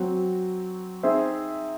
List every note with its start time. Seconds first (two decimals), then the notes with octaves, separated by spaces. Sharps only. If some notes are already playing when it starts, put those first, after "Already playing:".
Already playing: F#3 C4 F#4
1.03 C4 D#4 G#4 C5 E5